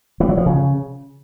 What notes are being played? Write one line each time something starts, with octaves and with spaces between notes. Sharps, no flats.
E3
F#3
F3
C#3